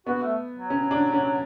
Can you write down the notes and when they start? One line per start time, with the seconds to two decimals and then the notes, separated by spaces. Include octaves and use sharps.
0.07 B3 F#4
0.22 A3
0.54 F#3
0.70 C#4
0.91 D4
1.12 C#4